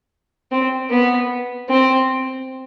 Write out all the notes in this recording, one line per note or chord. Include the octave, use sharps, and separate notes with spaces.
C4
B3
C4